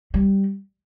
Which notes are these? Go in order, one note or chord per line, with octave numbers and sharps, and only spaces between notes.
G3